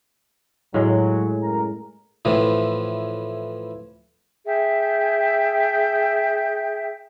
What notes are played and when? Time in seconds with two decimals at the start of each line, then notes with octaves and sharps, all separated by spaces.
0.74 A2 F#3 G#3
1.43 F#2 A#4 A#5
2.25 A2 E3 F3
4.45 G#4 E5 G5